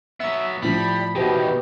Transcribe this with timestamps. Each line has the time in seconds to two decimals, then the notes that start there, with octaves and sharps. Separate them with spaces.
0.20 F#3 B3 E5
0.62 A2 F3 G3 B5
1.15 E2 B2 D#3 G4 C5